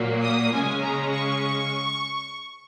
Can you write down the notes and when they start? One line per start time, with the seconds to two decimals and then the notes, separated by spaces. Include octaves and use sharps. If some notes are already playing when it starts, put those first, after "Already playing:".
Already playing: A#2 F#3 A#3
0.22 D#6
0.53 C#3 G#3 C#4 G#5
0.82 A#5
1.11 C#6